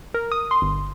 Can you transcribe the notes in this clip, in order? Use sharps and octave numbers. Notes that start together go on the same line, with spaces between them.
A#4
D#6
C6
G1